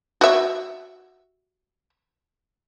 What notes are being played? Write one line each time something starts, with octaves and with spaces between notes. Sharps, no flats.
F#4 E5